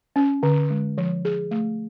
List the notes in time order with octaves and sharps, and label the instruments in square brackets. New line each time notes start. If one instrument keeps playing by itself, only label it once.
[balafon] C#4
D3
G#3
F3
G#4
A3